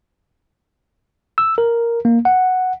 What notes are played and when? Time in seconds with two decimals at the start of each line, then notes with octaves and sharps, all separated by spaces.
1.38 E6
1.58 A#4
2.05 A#3
2.25 F#5